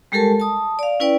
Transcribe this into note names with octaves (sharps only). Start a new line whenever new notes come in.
G3 G#3 G4 A4 A#4 A5
A5 D#6
D5 F5
C#4 E4 B4 D5 G5